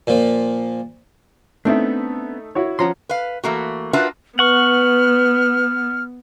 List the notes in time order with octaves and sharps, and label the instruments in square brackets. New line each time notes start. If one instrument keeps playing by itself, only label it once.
[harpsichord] A#2 F3
[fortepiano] A3 D#4 E5 [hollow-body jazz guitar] B3 C4 D4
[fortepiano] E4 F#4 C#5
[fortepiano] F3 C#4 [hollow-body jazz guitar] F#5 A#5 C6
[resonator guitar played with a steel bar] B4 F5
E3 A3 A#3 F#4
D4 F4 F#4 A#4 B4 E5
[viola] B3 [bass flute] B4 [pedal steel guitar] F#5 C#6 [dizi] F6